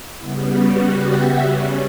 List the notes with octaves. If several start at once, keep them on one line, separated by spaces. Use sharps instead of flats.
C#3 G3 B3 E4
F#4
G4
E5
C#3 G3 C#4 F#5